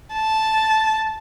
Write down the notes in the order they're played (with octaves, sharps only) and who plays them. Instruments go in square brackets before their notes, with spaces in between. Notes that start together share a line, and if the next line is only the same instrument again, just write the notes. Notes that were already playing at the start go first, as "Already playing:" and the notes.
[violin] A5